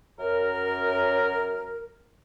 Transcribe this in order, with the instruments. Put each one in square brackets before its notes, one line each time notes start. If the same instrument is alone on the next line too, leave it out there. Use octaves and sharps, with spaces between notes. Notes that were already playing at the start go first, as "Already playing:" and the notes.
[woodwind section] F#2 A#4